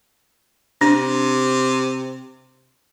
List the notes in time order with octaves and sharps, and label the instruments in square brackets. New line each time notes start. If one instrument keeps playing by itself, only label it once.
[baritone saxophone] C3 [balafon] D4